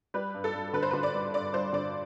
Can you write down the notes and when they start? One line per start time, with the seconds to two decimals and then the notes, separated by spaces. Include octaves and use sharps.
0.14 G3 B4
0.34 G2
0.44 A4
0.53 G2
0.73 D3 B4
0.83 C5
0.91 B4
0.93 D3
1.03 D5
1.14 G3
1.34 G2 D5
1.53 G2 C5
1.73 D3 D5